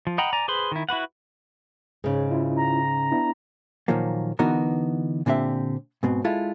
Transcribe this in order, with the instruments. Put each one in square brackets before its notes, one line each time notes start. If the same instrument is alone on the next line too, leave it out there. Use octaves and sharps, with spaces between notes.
[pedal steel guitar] F3
D#5 F#5 G5 A#5 B5
D5 G#5 A#5
G#4 B4 C5 B5 C6
D#3 E4
E4 F#4 B4 F#5
[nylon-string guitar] G#2 C#3 [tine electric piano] G#4 C#5
[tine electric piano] C#4 E4 F4
[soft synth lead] A#5
[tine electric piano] B3 D4 E4
[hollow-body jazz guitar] A#2 D#3 F3 F#3 A#3
D3 E3 B3 D#4 F#4 A#4
A#2 D3 C4 G4 E5
G#2 B2 C4
G#3 E4 F4 A4